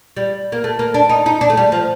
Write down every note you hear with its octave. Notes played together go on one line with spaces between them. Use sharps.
G3
A#3
A3
A#3
D4
D#4
D#4
D4
A3
G3
F3